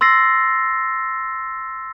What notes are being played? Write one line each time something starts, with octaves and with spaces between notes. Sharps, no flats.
C6 E6 A6 A#6 C7